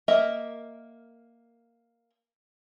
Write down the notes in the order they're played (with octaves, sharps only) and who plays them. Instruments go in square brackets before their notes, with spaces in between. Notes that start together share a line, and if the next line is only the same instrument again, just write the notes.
[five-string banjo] A#3 A#4 D#5 E5